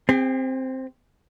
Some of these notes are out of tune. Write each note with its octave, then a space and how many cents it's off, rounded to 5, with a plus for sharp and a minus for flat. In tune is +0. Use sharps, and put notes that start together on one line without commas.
C4 +0 G#4 -45